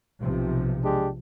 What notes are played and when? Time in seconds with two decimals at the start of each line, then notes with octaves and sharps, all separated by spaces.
0.19 B1 C3 F3
0.82 G#3 D4 G4